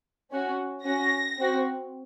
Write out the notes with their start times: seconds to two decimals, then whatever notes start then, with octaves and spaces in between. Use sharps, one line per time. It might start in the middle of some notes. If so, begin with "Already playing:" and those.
0.31 C#4 F#4
0.84 C#4 F#4 A#6
1.38 C4 F#4